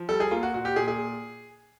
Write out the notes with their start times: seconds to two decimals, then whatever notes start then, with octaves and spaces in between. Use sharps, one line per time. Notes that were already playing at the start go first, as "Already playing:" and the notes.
Already playing: F3
0.09 G3 A4
0.20 G#4
0.31 A#3 F4
0.43 F#4
0.54 A#2 F#4
0.65 G4
0.76 A#2 G#4
0.88 G#4